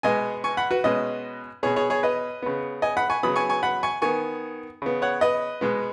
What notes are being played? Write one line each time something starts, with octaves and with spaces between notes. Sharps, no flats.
B2 G#3 B3 D#5 G#5
G#5 C#6
F#5 B5
F#4 B4
B2 G#3 C#4 B4 D#5
B2 B3 G#4 C#5
G#4 C#5
G#4 C#5
B4 D#5
C#3 B3
D#5 G#5
F#5 B5
G#5 C#6
C#3 F#3 B3 B5 D#6
G#5 C#6
G#5 C#6
F#5 B5
G#5 C#6
D#3 B3 G#5 C#6
C#3 B3
C#5 F#5
B4 D#5
B2 G#3 B3